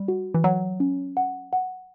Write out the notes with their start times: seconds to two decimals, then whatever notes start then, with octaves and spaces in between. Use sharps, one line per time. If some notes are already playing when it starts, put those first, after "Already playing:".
Already playing: G3
0.08 F#4
0.34 E3
0.44 F#3 F#5
0.80 C#4
1.17 F#5
1.53 F#5